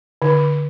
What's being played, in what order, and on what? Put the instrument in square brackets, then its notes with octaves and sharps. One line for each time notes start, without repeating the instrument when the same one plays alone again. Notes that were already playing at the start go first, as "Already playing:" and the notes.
[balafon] D3